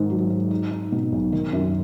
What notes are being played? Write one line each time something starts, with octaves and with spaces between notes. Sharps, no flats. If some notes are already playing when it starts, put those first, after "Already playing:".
Already playing: G#2 D#3 G#3
F#3
G#2
D#4
D#4
B2
B1
D#3
F#2